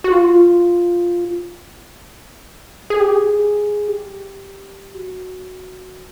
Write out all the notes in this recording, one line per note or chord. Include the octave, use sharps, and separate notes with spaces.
F#4
F4
G#4
G4
G#4
G4
F#4